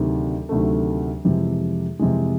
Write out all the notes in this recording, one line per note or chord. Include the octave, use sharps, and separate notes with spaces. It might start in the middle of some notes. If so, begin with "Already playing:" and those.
Already playing: D2 C3 D#3 F#3 A3
D2 C3 D#3 F#3 A3
F2 C3 E3 G#3
F2 C3 E3 G#3